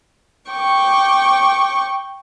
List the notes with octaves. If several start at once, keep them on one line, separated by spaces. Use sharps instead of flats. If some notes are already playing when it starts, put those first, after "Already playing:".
G5 C#6 D6